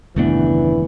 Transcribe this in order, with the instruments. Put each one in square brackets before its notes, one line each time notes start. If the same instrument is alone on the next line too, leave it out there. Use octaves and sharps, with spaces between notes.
[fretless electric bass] D#1 F#2 B3 [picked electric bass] C#3 A3 D4 [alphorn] E3